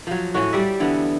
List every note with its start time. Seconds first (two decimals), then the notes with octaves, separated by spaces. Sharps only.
0.07 F3 F#3
0.34 A2 C#4 F#4
0.53 G3 D5 E5
0.80 D3 E3 B3